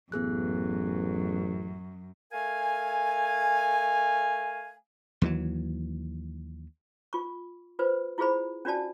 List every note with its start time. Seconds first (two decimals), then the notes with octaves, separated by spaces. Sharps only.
0.12 A1 F#2 B3 G#4 F#6
2.32 A3 A#4 F5 G#5
5.22 D#2 E3 F#3
7.13 F4 C#6
7.79 F4 B4 C5
8.18 E4 F4 G#4 C5 B5
8.65 C#4 D4 F4 F#4 D5 A5